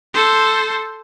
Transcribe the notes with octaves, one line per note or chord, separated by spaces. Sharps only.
A4 C5